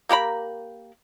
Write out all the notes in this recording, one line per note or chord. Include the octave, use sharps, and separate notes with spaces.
A#3 G4 A#4 B5